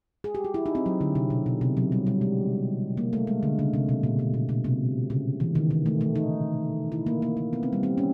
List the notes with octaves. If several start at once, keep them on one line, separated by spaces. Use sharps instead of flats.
G#4
G4
F#4
E4
D#4
C4
F#3
D3
C3
B2
B2
C3
F#3
G3
G3
G#3
A#3
A3
G#3
D3
C#3
C3
B2
A#2
B2
A#2
B2
C3
C#3
E3
D#3
D#3
A3
A3
D#4
E4
A#3
A#3
A#3
B3
C4
G3
C4
C#4